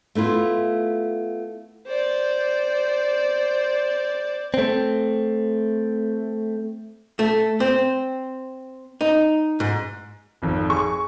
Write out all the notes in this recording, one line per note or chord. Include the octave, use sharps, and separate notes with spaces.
A3 B3 E4 F4
C5 D5
A3 C4
A3
C4
D#4
G#2
G#1 F2
G#4 C#6